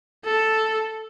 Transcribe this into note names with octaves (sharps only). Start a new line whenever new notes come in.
A4